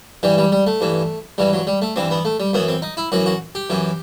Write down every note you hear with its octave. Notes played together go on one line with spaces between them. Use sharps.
G2 E3 G3
G3
G3
A3
G2 E3
G2 E3 G3
F#3
G3
A3
G2 E3 C4
B3
A3
G3
F#2 E3 B3
C4
D#4
E4
F#2 E3 F#4
F#4
G4
F#2 E3